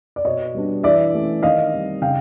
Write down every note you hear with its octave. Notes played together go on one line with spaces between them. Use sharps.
D5
B2 C#5 D#5
G3 B3 D4
E3 D5 E5
A3 C#4
D#3 D#5 F5
G3 C4
C#3 F5 G5